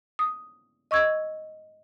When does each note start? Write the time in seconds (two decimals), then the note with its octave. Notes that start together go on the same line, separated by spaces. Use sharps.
0.19 D#6
0.91 D#5 C#6 E6 G#6